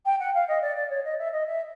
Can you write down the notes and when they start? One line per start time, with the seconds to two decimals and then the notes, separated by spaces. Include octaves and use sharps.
0.05 G5
0.19 F#5
0.34 F5
0.48 D#5
0.62 D5
0.76 D5
0.90 C#5
1.04 D#5
1.18 E5
1.32 D#5
1.46 E5